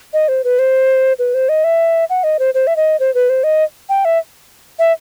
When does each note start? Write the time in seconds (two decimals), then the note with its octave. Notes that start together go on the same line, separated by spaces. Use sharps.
0.13 D#5
0.28 C5
0.44 B4
0.59 C5
1.19 B4
1.34 C5
1.49 D#5
1.64 E5
2.10 F#5
2.24 D#5
2.39 C5
2.54 C5
2.67 E5
2.76 D#5
3.00 C5
3.15 B4
3.30 C5
3.44 D#5
3.89 G5
4.05 E5
4.79 E5